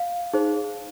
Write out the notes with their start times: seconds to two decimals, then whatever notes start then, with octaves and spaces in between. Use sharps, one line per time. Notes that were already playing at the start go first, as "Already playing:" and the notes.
Already playing: F5
0.33 D#4 G#4 C5